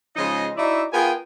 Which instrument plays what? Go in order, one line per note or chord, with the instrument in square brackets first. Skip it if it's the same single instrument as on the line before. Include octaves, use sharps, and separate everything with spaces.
[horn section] C#3 F3 G#3 D#4 D#5
D#4 E4 F#4 D5 E5
B3 F4 G#4 A#4 G5 G#5